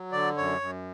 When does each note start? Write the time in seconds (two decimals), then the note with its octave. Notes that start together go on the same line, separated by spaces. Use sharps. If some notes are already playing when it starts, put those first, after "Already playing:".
Already playing: F#3
0.12 D3 D5
0.37 F#2 C#5
0.61 F#2